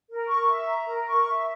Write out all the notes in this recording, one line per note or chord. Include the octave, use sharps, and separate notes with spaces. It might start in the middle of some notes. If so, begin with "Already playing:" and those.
A#4
C#6
E5
A#5
A#4
C#6
E5